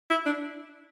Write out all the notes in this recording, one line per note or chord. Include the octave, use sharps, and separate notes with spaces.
E4
D4